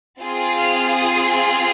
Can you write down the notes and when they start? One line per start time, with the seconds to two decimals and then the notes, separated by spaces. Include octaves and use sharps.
0.21 C4 F4 G#4
0.58 F6
0.95 D#6
1.31 C6